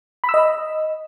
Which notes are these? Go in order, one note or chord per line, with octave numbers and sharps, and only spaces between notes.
B5
E6
D#5